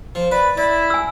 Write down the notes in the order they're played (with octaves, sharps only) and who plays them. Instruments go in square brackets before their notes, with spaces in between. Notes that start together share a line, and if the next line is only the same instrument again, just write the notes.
[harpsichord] F3
[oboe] B4 [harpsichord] D5
[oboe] E4 [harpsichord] D5
[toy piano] G#5 E6